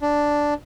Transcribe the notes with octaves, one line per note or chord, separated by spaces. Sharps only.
D4